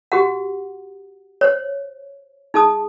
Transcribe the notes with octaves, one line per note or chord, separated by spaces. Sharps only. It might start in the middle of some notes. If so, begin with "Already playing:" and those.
F#4 G4 F#5
C5 C#5
D#4 G#4 A5 D#6